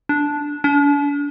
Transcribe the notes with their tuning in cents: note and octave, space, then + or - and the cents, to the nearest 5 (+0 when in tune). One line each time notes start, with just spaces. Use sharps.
D4 -5
D4 -40